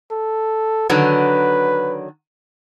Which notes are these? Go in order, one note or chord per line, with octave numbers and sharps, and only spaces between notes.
A4
D3 D#3 F#3 B4